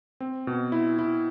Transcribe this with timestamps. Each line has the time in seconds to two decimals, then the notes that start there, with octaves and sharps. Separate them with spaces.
0.21 C4
0.47 B2
0.72 E4
0.99 E4